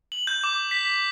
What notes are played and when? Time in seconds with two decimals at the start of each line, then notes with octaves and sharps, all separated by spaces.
0.12 F#7
0.27 G6
0.44 D6
0.71 B6